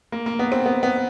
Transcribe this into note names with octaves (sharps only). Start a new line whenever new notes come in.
A#3
A#3
B3
C4
B3
B3